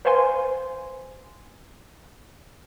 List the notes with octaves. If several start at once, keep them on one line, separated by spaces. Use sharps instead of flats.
B4 C5 F5 G#5 C6